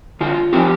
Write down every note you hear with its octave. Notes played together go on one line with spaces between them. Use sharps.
D3 F4
F3 C4 G4